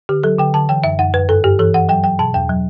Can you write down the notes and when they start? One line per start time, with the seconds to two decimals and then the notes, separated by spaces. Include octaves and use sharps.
0.09 D3 G4
0.23 F#3 A4
0.39 D3 G5
0.54 D3 A5
0.69 E3 G5
0.84 F#2 E5
0.99 F#2 F#5
1.14 F#2 B4
1.29 G2 A4
1.44 G2 G4
1.59 E3 A4
1.74 E3 F#5
1.89 F#3 G5
2.04 F#3 G5
2.19 B2 A5
2.34 E2 G5
2.49 F#3